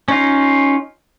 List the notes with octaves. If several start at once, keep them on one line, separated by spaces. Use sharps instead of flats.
C#4 D#4 F4